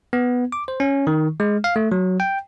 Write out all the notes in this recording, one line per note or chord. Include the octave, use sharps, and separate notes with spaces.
B3
D6
C5
C#4
D#3
G#3
F5
A3
F#3
G5